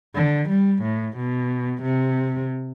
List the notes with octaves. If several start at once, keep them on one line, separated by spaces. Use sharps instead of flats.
D3
G3
A2
B2
C3